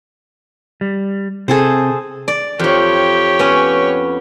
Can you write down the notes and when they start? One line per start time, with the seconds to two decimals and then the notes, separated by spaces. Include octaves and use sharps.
0.81 G3
1.48 C3 G#4 A4 C5
2.28 D5
2.59 F2 F3 G4 C#5
3.39 B3 C#4